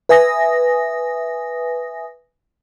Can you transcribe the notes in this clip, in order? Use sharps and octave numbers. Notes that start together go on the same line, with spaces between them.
B4 E5 G#5 D#6 A#6